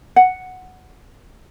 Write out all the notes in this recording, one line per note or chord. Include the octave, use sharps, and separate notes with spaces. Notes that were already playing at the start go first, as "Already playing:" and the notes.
F#5